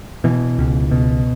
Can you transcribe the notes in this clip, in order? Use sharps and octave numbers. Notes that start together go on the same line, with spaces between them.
B2 E3
C#2
B2